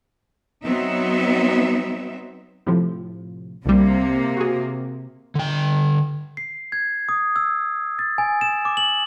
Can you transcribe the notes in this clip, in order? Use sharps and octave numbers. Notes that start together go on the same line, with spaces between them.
F#3 B3 C4 D#4 E5
A2 C3 F3
C2 C3 G3 A#3
F#4 G#4
D3 G5
C7
G#6
D#6
E6
A6
G#5
E7
D6
F#7